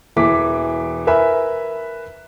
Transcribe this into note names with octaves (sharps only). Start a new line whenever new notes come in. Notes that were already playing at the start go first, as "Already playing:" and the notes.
E1 E3 D6 B6
A#4 B4 E5 G#5 B5